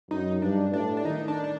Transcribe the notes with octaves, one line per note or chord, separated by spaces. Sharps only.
F#2 D#4
G2 D4
A2 D4
D4
D#3 D#4
D4
D4